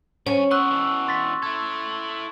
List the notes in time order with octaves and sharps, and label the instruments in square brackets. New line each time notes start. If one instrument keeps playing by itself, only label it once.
[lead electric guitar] D3 G#5 [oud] C#4 [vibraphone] C#5
[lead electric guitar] B3 C4 [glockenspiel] C#6 F#6 [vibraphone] E6
[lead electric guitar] B2 E3
[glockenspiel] C6 A6 B6
[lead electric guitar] E4 A4 [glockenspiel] G#6